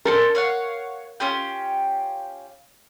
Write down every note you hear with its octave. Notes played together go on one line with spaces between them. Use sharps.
D4 A4 A#4 C5
C#5 F5 F#5
C#4 F4 G4